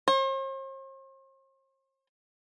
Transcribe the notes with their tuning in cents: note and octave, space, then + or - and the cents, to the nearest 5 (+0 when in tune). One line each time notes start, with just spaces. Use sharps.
C5 +45